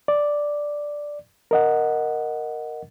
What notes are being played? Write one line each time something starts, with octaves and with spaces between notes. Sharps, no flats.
D5
A#4 D#5 F#5